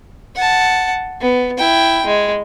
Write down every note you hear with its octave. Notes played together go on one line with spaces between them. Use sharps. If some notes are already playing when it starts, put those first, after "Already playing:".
F#5 A5
B3
E4 G5
G#3